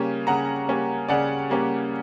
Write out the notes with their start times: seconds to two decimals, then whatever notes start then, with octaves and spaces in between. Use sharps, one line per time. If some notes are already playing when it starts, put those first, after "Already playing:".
Already playing: C#3 G3 A#3 C#4
0.27 C#3 F#5 A#5
0.69 G3 A#3 C#4
1.09 C#3 D5 F#5
1.50 G3 A#3 C#4